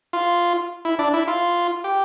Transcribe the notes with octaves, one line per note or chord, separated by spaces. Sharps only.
F4
E4
D4
E4
F4
G4